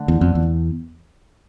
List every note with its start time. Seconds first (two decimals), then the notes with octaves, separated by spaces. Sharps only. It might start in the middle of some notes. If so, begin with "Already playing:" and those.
Already playing: D3 A3
0.08 E2
0.21 F2
0.35 E2